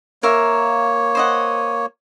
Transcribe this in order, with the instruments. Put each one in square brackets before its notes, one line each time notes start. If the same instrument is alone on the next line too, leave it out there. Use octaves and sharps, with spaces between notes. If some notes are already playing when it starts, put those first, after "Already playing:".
[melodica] A#3 C#5 [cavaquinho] A#4 E5 F5
[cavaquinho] C5 D#5 F#5